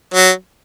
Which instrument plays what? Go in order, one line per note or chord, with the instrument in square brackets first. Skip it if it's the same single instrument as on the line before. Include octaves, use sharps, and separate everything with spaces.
[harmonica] F#3